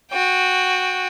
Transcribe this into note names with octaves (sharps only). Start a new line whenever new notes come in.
F#4 G5